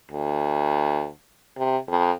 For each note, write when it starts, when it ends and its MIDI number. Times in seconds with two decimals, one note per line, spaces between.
0.12 1.07 38
1.57 1.77 48
1.88 2.11 41